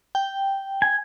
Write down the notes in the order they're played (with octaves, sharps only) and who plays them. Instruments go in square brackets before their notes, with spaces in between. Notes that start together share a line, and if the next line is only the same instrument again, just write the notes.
[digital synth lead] G5
[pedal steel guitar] G#5